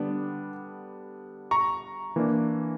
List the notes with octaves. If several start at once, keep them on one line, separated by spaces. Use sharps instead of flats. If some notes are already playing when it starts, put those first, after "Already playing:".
Already playing: D3 G3 B3 D4
A#5 C#6
E3 A#3 D4